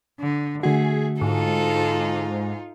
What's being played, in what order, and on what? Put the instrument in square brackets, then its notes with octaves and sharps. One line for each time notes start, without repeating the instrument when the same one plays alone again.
[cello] D3
[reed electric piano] D3 F#4 [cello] A3 [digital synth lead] G#4
[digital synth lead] G#2 [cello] D#4 F4 [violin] A4